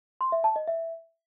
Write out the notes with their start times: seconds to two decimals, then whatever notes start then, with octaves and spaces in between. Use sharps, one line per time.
0.21 C6
0.32 E5
0.44 A5
0.56 D#5
0.67 E5